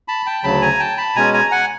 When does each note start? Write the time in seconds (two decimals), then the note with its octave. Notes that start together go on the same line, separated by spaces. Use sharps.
0.08 A5 B5
0.26 G5 A5
0.44 D2 C#3 F#3 A5 B5
0.62 G#5 A#5
0.80 G5 A5
0.97 A5 B5
1.16 B2 G#3 C#4 G#5 A#5
1.33 G#5 A#5
1.51 F#5 G#5